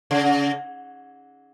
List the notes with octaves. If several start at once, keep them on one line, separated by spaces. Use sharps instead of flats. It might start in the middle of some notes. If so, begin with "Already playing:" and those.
C#3